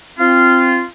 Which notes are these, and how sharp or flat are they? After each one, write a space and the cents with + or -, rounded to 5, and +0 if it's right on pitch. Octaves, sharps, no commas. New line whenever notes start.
C4 +0 F4 -15